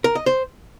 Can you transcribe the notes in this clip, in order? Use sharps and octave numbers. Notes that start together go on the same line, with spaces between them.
A#4
D#5
C5